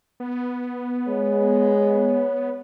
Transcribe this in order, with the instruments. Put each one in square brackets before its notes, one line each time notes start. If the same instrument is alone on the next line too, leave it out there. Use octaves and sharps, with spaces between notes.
[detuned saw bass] B3
[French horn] G#3 [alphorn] C#5